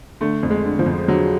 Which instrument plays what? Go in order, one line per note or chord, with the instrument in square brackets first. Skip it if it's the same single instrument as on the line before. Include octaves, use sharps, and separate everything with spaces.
[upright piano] D3 A3
F2
G#3
D3
F3
F2
D3 F#3